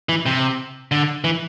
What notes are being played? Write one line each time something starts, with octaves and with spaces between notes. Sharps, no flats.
E3
C3
D3
E3